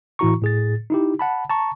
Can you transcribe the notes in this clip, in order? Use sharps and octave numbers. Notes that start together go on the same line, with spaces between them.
A2 E3 E4 F#4 A#5 C#6
A2 G#4 A6
D#4 E4 G4
F#5 A5 B5
A5 A#5 C#6